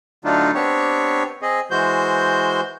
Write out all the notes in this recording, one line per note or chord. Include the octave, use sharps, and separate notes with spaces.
D3 F#3 A3 D4 D#4 F4
B3 C4 D4 G4 C#5
C4 G#4 D#5
E3 G#3 F#4 C5 G6